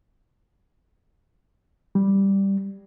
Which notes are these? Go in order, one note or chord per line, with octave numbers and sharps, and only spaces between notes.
G3